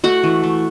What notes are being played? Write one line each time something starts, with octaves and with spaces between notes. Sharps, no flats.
A3 F#4 F#5
E3
A3